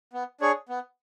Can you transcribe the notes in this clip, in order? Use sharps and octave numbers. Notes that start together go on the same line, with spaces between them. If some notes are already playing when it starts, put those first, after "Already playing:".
B3
D4 G#4 C#5
B3